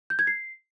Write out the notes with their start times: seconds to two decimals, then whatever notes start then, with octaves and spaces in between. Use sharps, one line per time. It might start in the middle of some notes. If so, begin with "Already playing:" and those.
0.10 G6
0.19 G#6
0.27 C7